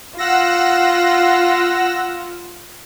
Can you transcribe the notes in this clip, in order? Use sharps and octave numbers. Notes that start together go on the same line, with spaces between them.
F4 F#5 E6 A#6